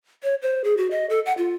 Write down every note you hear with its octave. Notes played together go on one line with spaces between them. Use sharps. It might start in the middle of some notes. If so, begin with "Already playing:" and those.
C#5
C5
G#4
F#4
D#5
A4
F#5
F4